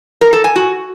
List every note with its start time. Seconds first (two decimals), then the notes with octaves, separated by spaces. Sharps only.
0.21 A#4
0.33 A4
0.44 G#5
0.56 F#4